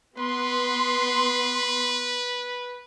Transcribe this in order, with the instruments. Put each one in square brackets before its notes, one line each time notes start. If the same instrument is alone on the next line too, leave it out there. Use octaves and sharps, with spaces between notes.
[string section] B3 C6 [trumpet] B4